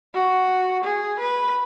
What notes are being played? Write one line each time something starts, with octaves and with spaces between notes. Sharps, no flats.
F#4
G#4
B4